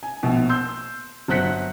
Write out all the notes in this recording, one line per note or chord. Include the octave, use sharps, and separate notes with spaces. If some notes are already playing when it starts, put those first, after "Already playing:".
G#5
A#1 B2
C6 E6 G6
G1 F#3 C5 F#6 B6 C#7